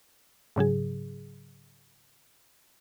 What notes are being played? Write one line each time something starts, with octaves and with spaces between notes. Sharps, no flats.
G#2 C#3 F#3 G#4